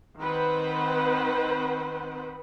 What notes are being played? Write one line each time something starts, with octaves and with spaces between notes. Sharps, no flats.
D#3 C4 B4 C5 F#5